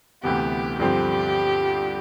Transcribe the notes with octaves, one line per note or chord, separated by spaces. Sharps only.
D2 C3 E3 B3 G4
G2 D3 F3 C4 G4